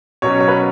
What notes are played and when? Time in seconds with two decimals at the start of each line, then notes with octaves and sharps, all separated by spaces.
0.22 B2 F#3 C#4 C#5
0.41 C#5
0.48 B4